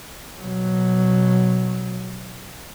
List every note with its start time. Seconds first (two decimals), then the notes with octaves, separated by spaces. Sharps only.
0.41 B2 F#3